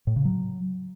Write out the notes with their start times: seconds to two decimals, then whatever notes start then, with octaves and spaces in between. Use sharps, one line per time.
0.07 A2
0.16 C#3
0.25 F#3